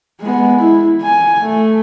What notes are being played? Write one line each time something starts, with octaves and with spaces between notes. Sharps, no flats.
G#3 B3
E4
G#5
A3